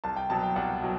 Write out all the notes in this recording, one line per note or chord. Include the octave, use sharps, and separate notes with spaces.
C2 A5
G5
B2 F#3 A5
G5
C2 F#5
B2 F#3